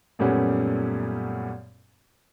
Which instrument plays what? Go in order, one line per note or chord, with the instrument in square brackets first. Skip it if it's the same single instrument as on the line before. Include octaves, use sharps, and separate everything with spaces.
[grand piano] F#2 A#2 G3 A3 B3 C#4